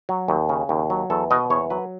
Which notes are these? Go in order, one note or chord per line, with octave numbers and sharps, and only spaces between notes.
F#3
D#2
C#3
D#2
F#3
E2 A4
B2 D#5
E2 C#5
F#3 B4